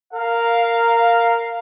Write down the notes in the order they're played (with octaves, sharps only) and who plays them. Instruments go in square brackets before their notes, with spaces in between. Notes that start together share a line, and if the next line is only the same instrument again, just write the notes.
[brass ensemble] A#4 F5